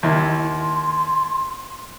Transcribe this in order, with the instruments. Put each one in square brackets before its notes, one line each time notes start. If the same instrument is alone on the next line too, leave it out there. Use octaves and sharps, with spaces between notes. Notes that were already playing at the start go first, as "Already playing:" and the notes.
[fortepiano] D#2 E4 [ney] C6